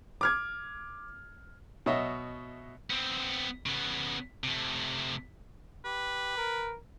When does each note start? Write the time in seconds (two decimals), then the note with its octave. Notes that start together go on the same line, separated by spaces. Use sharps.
0.21 D6 F6 G#6
1.86 B2 C#5 D#5 E5
2.90 B3 C4
3.66 C#3 B3
4.44 C3 A3
5.85 G4 B4
6.37 A#4